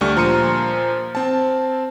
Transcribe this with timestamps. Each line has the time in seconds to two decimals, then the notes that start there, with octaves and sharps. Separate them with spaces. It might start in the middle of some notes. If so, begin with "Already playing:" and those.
0.01 D2 G3 A3 D4 C#6 F6
0.16 A#2 F3 A#5 C6 C#7 D#7
1.15 C4 A5